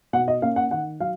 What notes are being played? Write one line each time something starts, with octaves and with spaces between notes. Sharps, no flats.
B2 F#5
D#5
A#3 C#4 F5
F#5
D#3 F#5
F#3 F5